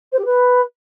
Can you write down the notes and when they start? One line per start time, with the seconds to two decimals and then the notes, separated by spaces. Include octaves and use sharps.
0.12 C5
0.19 G4
0.25 B4